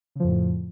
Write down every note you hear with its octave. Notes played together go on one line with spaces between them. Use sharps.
F2 A2 C#3 F3